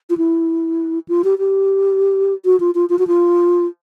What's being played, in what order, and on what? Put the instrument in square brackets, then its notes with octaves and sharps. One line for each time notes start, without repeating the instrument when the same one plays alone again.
[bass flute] F4
E4
F4
G4
G4
F#4
F4
F4
F4
F#4
F4